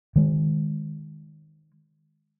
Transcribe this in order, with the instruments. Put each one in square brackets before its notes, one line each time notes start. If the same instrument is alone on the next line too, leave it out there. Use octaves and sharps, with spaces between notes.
[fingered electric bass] D#3 G#3